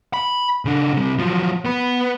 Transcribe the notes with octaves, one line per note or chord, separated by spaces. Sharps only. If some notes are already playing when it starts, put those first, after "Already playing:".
B5
C#3 D4
C3 G3
F3 F#3
B3 B4